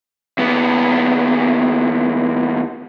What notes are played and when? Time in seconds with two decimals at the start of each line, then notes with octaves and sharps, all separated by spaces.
0.38 D#2 B3